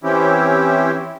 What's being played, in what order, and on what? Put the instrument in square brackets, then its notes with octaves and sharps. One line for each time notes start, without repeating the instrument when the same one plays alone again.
[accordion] E3 C4 C#4 E4 G4